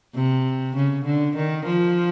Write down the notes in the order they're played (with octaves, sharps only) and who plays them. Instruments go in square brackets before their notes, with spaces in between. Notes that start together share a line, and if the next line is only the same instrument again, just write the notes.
[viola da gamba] C3
C#3
D3
D#3
F3